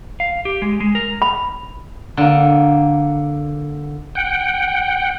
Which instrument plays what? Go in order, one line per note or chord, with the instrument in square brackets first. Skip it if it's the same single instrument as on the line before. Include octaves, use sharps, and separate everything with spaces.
[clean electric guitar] F5
G4
G#3
G#3
A#4
[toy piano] B5
[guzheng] D3 A#3
[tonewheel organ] F#5 G5